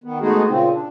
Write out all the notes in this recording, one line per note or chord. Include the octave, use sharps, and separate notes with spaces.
D#3 B3
G#3 A3 B3 D#4 F#4 G#4
A#2 C#3 C4
D4